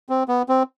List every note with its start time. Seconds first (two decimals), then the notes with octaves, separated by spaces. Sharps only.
0.09 C4
0.28 B3
0.49 C4